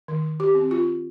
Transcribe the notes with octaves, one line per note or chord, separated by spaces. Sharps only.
D#3
G4
C4
F4